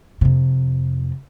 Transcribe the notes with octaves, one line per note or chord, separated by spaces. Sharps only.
F2 C3